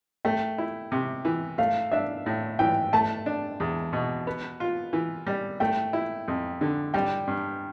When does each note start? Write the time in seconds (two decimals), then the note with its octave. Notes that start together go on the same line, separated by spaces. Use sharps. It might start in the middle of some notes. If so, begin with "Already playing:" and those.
0.25 A3 G5
0.58 E4
0.92 C3
1.25 E3
1.58 A3 F5
1.92 D4 E5
2.26 A2
2.59 E3 G5
2.93 A3 A5
3.26 D4
3.60 E2
3.93 B2
4.27 B3
4.60 F4
4.93 E3
5.27 G3
5.60 A3 G5
5.93 E4
6.28 F2
6.61 D3
6.94 G3 G5
7.27 G2